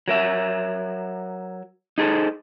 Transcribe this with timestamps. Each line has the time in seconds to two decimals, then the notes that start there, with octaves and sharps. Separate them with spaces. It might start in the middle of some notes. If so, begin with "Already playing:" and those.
0.08 F#3 A#4 E5
1.98 D#4 G#4 A4 C5